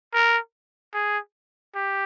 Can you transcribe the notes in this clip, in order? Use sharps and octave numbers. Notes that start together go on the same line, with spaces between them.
A#4
G#4
G4